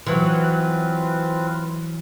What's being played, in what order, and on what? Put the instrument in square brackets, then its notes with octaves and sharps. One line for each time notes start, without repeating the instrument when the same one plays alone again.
[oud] E3 F#3 [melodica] C4 F4 B4